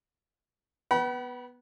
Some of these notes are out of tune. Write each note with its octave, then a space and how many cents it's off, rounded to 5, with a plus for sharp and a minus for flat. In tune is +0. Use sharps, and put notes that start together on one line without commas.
B3 -5 F#5 +40 B5 -30